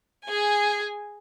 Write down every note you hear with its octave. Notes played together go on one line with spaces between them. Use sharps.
G#4 G#5